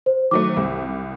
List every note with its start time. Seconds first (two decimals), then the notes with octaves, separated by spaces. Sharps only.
0.06 C5
0.31 D#3 F#3 A3 D6
0.57 C2